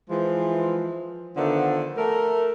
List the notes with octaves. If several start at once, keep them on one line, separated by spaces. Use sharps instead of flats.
E3 F3 G#3
D3 D#3 F3 A3 B3 D4
A3 A#4